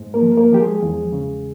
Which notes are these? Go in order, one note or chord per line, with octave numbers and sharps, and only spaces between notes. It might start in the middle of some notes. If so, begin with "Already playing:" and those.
Already playing: G#2
A#3 A#4
F3
A#3 A#4
F3 G4
G#3 G#4
E2
C#3